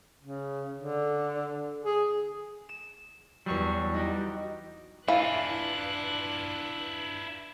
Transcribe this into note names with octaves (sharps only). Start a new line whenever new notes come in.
C#3
D3
G#4
E7
E2 F#3 G3 C#6 C7
D#4 F#4 G4
E3 D4 E4 F4 B4 F5 F#6